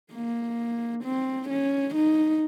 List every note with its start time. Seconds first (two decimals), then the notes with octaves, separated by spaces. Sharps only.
0.13 A#3
1.04 C4
1.49 C#4
1.95 D#4